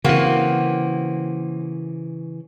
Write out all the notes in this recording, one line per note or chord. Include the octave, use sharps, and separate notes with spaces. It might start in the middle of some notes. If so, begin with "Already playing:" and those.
C#3 E3 A#3 C4 F#4